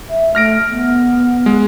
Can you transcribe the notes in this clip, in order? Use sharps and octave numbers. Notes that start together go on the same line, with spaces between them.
E5
A3 F6 A#6 D7
B3
G#3